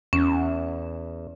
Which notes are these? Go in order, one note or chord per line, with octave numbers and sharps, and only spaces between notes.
E2 C#4